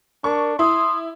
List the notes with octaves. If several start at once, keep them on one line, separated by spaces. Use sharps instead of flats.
D4 A#4 C#6
E4 C6 D#6